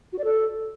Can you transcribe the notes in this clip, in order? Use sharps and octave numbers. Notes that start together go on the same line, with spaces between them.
F#4
D5
A4